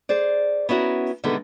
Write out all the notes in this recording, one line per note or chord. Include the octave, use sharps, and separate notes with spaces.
G#4 C5 D5
B3 C#4 E4 F#4 A#4
B2 D3 D#3 G#3 A3 B3